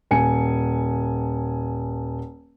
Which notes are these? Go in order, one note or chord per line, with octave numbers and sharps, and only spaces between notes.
D#1 G#5 C#7